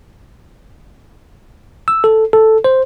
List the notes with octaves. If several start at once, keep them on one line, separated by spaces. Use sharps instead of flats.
E6
A4
A4
C5